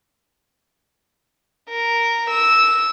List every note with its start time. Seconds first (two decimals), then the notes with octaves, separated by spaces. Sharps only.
1.69 A#4
2.30 E6